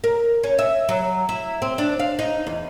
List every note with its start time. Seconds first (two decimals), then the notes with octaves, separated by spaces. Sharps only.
0.04 A#4
0.43 C#4
0.59 E5
0.89 F#3
1.29 E4
1.62 C4
1.78 D4
1.99 F5
2.19 D#4
2.47 E2